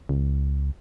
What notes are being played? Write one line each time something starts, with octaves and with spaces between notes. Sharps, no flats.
C#2